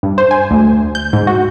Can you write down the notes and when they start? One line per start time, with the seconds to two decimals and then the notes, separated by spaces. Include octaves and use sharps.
0.03 G2
0.18 C5
0.31 G#5
0.51 D2
0.95 G6
1.13 G#2
1.27 F#4